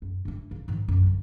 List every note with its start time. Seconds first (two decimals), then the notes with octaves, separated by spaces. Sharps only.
0.02 F#2
0.25 G2 E4
0.51 C#3
0.68 G#2 D#3
0.88 F#2
1.03 D3 F#3